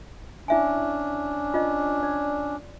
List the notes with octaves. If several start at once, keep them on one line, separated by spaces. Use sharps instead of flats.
C#4 D4 E4 E5 G#5
F4 D#5
D5